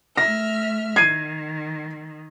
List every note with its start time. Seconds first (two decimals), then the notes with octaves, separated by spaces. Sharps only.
0.17 A3 E5 F6 A#6
0.96 D#3 G#6 C7 D#7